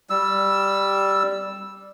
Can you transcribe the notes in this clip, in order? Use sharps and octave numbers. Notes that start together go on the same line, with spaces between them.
G3 E6